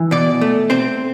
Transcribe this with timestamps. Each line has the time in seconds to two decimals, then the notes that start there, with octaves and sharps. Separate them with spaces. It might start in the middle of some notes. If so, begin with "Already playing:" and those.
Already playing: E3
0.11 B2 D5
0.41 A3
0.70 C4 C5